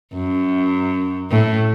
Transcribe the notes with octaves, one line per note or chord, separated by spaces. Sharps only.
F#2
A2